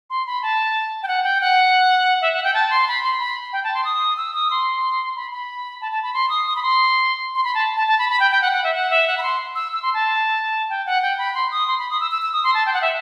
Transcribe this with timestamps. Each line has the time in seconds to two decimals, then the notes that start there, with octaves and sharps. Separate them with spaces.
0.10 C6
0.27 B5
0.42 A5
1.03 G5
1.08 F#5
1.24 G5
1.41 F#5
2.22 E5
2.33 F#5
2.44 G5
2.54 A5
2.70 C6
2.88 B5
3.03 C6
3.20 B5
3.53 G5
3.64 A5
3.74 C6
3.84 D#6
4.17 E6
4.34 D#6
4.51 C6
5.16 B5
5.31 B5
5.81 A5
5.92 A5
6.03 B5
6.14 C6
6.29 D#6
6.47 D#6
6.56 B5
6.63 C6
7.35 C6
7.44 B5
7.55 A5
7.76 A5
7.87 A5
7.99 B5
8.10 B5
8.20 G5
8.31 G5
8.42 F#5
8.53 F#5
8.64 E5
8.75 F#5
8.90 E5
9.08 F#5
9.18 B5
9.23 C6
9.55 E6
9.72 E6
9.83 C6
9.94 A5
10.70 G5
10.86 F#5
11.02 G5
11.18 B5
11.35 C6
11.51 D#6
11.68 C6
11.79 B5
11.90 D#6
12.00 E6
12.11 E6
12.22 E6
12.33 D#6
12.44 C6
12.54 A5
12.66 G5
12.73 F#5
12.82 E5